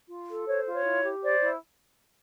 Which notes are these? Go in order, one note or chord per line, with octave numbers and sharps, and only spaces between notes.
F4
A4
C5 C#5
F4
C#5
E4
G4
C5 D5
E4